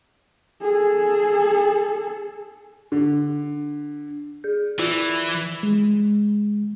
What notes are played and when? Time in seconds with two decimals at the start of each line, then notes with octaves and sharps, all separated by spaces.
0.61 G#4 A4
2.92 D3
4.44 G#4 G6
4.79 E3 E4 F4 D5
5.63 G#3